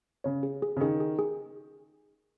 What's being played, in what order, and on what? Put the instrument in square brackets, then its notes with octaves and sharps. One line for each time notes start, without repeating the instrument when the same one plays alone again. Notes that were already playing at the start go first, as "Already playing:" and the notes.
[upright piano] C#3 [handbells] C#5
[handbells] G#4
G#4
[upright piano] C#3
[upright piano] D#3 [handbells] G#4
[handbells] G#4
G#4